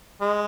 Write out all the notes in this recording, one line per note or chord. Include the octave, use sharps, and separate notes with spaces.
G#3